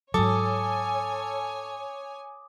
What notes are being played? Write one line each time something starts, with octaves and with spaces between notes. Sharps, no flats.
G#2 F#3 A4 C#5 G#5 D6 D#6